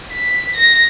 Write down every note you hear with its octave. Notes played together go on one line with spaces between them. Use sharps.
B6
A#6